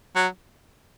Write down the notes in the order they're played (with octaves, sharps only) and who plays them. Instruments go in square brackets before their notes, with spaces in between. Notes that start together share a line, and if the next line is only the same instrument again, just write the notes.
[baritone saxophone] F#3